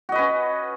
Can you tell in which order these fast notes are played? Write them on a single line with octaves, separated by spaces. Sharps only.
F#4 D#5 B4 C#4